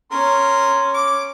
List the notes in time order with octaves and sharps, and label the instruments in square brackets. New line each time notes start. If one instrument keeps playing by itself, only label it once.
[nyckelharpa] C#4 [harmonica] A#4 C6
[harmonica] D6